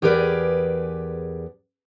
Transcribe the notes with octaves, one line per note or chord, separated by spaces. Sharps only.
E2 G4 G#4 A#4 B4 D5